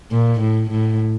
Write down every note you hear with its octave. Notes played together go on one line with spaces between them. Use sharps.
A#2
A2
A2